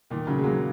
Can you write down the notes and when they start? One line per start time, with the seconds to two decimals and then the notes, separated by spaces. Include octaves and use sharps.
0.10 A#2 D#3
0.27 C#3 F#3
0.38 G#3
0.44 F#3 A#3